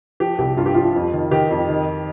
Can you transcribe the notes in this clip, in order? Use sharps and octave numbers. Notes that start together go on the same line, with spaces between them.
F3 G4
C2 G4
G2 F4
G4
F3 F4
F2
D#3
D#3 G4
F2
D#3